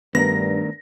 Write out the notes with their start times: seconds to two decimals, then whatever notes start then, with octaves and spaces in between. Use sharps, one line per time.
0.15 G2 D#3 A3 B3 D4 A#4 A#6